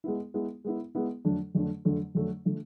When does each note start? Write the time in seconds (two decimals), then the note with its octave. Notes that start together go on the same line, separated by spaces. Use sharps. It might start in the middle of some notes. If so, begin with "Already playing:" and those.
0.04 G#3 B3 E4
0.34 G#3 B3 E4
0.64 G#3 B3 E4
0.95 G#3 B3 E4
1.25 F2 D3 F#3 A3 D4
1.55 F2 D3 F#3 A3 D4
1.85 F2 D3 F#3 A3 D4
2.15 F2 D3 F#3 A3 D4
2.45 D3 F3 A3